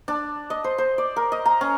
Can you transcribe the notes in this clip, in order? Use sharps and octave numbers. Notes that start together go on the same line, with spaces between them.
D4
D#5
C5
C5
D5
A#4
D#5
A#5
C#4